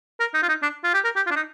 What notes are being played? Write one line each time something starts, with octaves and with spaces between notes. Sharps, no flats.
A#4
D#4
F4
D#4
D4
F4
G4
A#4
G4
F4
D4
D#4